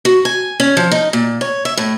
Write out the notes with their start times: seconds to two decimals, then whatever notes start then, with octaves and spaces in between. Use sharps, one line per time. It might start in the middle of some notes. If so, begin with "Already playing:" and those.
0.05 F#4
0.25 G#5
0.60 C#4
0.77 F3
0.92 D#4
1.13 A#2
1.41 C#5
1.65 E5
1.77 A2